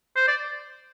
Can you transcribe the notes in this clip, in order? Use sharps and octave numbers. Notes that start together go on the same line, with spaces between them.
C5
D5